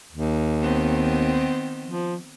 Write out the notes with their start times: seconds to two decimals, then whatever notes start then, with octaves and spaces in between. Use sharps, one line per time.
0.11 D#2
0.61 D#3 B3 C4
1.85 F3